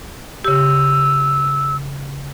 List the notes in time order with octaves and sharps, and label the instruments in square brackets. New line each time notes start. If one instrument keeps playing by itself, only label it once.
[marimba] C#3 G4 [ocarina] E6